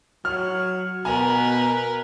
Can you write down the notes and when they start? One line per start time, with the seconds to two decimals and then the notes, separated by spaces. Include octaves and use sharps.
0.25 F#3 F6
1.05 B2 A#4 B4 G#5 A#5